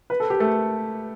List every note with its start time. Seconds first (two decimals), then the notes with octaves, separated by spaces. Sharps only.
0.10 B4
0.20 A4
0.30 G4
0.40 A3 A4